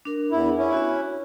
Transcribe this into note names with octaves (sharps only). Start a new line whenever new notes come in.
D4 A#4
E2 E4
C#4 E4
F#4 E5